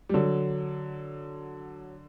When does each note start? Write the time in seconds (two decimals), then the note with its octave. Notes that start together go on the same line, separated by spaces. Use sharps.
0.09 G3
0.14 D3 F#3